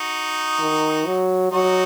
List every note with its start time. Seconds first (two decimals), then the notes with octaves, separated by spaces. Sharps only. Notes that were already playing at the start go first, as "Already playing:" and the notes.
Already playing: D#4 F#4
0.60 D#3
1.06 F#3
1.52 F#3 D#4 F#4